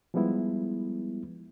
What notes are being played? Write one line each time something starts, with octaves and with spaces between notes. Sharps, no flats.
F3 G3 G#3 B3 E4